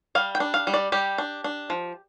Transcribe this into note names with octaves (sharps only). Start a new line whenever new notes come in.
G3 F5
G5
D4
F5
G3
D5
G3 G4
D4
D4
F3